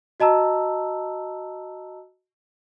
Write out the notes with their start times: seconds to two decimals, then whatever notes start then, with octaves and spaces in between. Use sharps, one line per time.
0.20 F#4 D#5 A5 A#5 E6